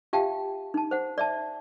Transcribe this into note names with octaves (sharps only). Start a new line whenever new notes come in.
F4 G4 E5 F5 G5 A5
D#4 A5
C5 F#5
D5 E5 A5